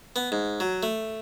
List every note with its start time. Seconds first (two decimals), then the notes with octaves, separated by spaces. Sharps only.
0.16 B3
0.32 G#2
0.60 F#3
0.83 A3